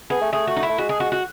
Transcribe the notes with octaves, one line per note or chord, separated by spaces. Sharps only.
B3 G#4
A3
A3 G#4
F#4
D#4
E4
A3
G#3 F#4
G#4
F#4
F#4